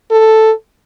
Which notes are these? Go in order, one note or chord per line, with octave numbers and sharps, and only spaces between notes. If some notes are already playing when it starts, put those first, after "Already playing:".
A4